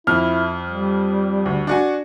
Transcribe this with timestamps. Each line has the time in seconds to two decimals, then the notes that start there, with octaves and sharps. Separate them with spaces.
0.07 F2 E4 F6
0.69 G3
1.46 D2
1.67 D4 F#4 G#5